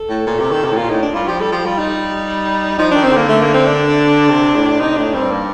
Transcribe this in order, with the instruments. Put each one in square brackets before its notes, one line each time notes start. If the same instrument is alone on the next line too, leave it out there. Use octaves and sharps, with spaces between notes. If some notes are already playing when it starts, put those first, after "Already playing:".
Already playing: [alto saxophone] A4
[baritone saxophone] A2
A#2
C3
D#3
C3
A2
[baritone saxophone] A#2 [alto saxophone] F4
[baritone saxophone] A2 [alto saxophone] D#4
[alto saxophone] D4
[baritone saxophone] G2 [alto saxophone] F4
[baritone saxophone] F3 [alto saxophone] G4
[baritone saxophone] G3 [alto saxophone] A4
[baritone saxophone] F3 [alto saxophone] G4
[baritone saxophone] G3 [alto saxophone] F4
[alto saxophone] D#4
[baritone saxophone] F3 [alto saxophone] D#4
[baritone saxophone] D#3 [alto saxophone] D4
[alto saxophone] C4
[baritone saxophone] D3 [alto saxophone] A#3
[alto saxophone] A3
A#3
C4
D4
[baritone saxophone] C3
A2
[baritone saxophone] C3 [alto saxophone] D#4
[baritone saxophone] A2 [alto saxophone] D4
[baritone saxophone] G2 [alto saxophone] C4
[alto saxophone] A#3